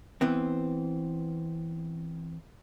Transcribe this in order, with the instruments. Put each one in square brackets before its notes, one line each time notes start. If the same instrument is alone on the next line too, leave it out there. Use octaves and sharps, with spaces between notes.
[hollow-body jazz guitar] E3 B3 C4